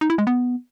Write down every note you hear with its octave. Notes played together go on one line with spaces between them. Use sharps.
D#4
E4
G#3
B3